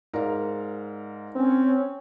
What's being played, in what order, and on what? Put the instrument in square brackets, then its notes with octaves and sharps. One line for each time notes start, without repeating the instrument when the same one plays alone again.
[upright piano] G#2 [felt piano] A#4 D5 F5
[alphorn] C4 [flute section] C#4